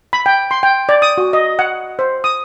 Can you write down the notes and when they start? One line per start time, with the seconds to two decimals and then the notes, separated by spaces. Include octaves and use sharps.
0.13 B5
0.26 G5
0.51 C6
0.63 G5
0.89 D5
1.02 D#6
1.18 F#4
1.33 D#5
1.59 F#5
1.99 C5
2.24 D#6